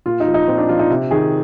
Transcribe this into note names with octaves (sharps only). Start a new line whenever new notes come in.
A#2 F4
D#4
F3
D#4
A#2 C4
D4
F3 F4
D#4
C3
D#3 G#4